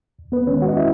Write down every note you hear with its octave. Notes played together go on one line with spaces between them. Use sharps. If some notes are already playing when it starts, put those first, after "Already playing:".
D#2
B3 B4
D#3 G#3 C#4 C#5
F#4 F#5
D#5
E4 E5